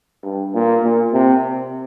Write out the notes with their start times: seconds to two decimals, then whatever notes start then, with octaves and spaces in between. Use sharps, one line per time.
0.24 G2
0.55 A#2
0.84 A#2
1.13 C3